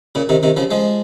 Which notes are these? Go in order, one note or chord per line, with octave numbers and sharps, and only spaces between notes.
A#2 C#3
C3 D#3
C3 D#3
C#3 F3
F3 G#3